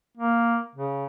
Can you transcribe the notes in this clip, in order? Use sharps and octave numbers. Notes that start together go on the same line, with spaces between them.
A#3
C#3